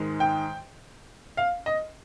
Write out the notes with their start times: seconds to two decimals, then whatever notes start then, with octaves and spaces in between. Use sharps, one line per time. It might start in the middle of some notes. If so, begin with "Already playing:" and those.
Already playing: G#2 D#3 G#3
0.20 G5
1.37 F5
1.66 D#5